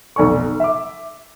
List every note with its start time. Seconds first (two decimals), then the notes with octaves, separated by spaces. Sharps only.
0.16 F1 B1 D5 G#5 C#6
0.60 E5 D6